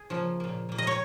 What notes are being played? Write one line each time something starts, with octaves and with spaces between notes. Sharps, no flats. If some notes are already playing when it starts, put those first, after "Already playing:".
Already playing: G#4
C#3 F3 A#3
A#2 A#3
A#2 A#3
D#5
C#5